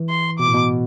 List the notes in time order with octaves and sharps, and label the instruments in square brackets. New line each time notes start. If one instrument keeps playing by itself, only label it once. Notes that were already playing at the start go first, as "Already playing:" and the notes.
Already playing: [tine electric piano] E3
[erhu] C6
[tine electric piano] B2 [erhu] D6
[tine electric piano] A2
B2